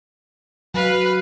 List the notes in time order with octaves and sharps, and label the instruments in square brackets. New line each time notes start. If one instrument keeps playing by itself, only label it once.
[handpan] F#3 [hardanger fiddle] B4 F5